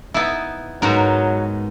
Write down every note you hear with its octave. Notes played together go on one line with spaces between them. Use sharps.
B3 D#4 E4
G#2 F#3 B3 D#4 F#4 A#4